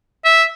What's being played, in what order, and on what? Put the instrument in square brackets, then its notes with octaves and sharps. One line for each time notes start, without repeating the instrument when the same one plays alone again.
[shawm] E5